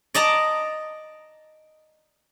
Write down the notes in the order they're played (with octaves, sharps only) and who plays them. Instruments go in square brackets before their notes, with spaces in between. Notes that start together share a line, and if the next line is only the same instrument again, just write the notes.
[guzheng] D5 D#5 A5 A#5